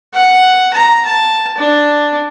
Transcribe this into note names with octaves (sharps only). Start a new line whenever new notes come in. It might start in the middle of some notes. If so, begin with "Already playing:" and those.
F#5
A#5
A5
D4